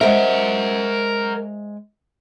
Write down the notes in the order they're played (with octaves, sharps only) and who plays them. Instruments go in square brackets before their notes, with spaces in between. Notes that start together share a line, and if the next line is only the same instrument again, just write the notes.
[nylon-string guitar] G#3 C5 E5 [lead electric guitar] A#4 F#5